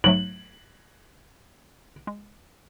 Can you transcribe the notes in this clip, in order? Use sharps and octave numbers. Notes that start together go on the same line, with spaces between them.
G#2 F#3 A3 F#7
G#3